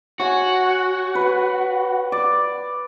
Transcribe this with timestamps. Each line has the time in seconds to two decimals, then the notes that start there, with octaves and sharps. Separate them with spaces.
0.20 F#4 C#5 G#5
1.15 B4
2.12 D5